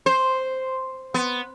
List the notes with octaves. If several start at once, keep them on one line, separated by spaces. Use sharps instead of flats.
C5
B3